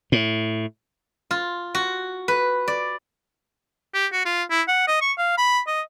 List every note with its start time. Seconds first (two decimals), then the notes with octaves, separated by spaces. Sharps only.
0.12 A2
1.31 F4
1.75 F#4
2.28 B4
2.68 D5
3.94 G4
4.13 F#4
4.25 F4
4.50 E4
4.68 F#5
4.87 D#5
5.01 C#6
5.18 F5
5.38 B5
5.67 D#5